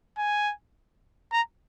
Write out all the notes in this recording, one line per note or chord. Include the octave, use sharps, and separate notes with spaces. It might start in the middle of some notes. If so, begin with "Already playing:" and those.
G#5
A#5